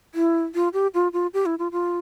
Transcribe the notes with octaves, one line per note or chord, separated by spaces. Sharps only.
E4
F4
G4
F4
F4
G4
E4
F4
F4